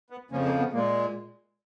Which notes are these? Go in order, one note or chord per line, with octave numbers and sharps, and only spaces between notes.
B3
F2 C#3 F3 A#3 C#4
A#3
B3
A#2 G#3 A#3